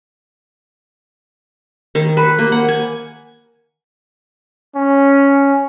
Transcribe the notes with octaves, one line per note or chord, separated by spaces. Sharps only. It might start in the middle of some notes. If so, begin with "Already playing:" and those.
D#3
B4
A#3
F#5
G#5
C#4